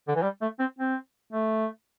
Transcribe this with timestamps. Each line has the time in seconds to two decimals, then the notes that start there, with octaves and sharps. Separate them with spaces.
0.08 D3
0.15 E3
0.23 G3
0.41 A3
0.59 C4
0.78 C4
1.33 A3